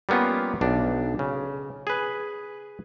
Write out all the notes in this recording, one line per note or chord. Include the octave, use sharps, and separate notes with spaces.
G3 A#3 B3 C#4 F4
B1 D4
C#3
G#4 B4